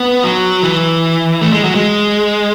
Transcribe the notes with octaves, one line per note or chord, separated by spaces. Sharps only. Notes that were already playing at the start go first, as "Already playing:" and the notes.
Already playing: B3
F#3
E3
A3
G#3
F#3
G#3